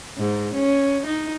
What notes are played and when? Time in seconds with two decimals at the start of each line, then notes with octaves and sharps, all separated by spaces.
0.18 G#2
0.54 C#4
1.06 D#4